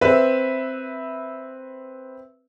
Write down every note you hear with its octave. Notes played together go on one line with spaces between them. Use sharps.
C4 B4 E5